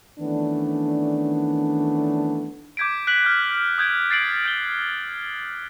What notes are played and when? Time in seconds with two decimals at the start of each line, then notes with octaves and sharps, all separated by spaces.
0.19 D#3 E3 A3 B3 C#4 D4
2.77 D6 G6 G#6 B6 D7
3.07 F#6 B6 F#7
3.25 F6 G6
3.78 D#6 G6 G#6 D7
4.11 A6 C7 D7 F#7
4.45 G6 D7 G7